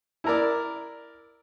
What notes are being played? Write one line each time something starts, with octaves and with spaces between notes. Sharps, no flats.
E4 A#4 D5